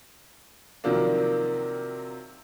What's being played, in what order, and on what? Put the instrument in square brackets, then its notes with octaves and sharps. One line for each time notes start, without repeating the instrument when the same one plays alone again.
[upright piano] C3 D#3 F3 F#3 A#3 D4